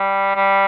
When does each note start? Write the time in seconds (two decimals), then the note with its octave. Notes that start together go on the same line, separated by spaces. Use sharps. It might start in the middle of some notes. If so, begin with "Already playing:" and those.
Already playing: G3
0.36 G3